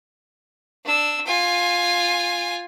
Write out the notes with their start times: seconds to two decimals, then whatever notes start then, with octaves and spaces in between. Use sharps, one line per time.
0.84 D4 E6
1.26 F4 G#5